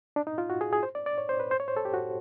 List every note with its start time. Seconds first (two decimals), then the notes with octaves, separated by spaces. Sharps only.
0.16 D4
0.27 D#4
0.38 F4
0.50 F#4
0.61 G#4
0.73 G#4
0.83 C5
0.95 D5
1.06 D5
1.18 C#5
1.29 C5
1.40 B4
1.51 C5
1.60 C#5
1.68 C5
1.77 A4
1.85 G4
1.93 F#4